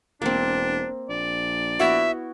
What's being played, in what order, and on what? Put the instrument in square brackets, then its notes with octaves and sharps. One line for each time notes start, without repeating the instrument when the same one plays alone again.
[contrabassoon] E1 [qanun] A#3 C4 [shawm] D4
[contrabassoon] A#1 [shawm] D5
[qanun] B3 E4 F#4 [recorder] E5